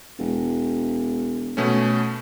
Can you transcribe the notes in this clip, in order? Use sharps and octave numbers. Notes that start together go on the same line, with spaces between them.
E1
B2 A3 C#4